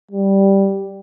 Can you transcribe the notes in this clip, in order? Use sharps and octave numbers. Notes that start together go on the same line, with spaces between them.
G3